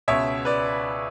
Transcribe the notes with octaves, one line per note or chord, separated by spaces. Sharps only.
C#2 B2 C#5 E5
B4 D5